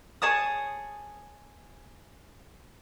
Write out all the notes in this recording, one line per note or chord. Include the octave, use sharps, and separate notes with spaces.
G#4 C#5 A5 D#6